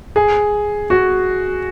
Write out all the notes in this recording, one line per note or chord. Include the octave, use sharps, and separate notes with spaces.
G#4
F#4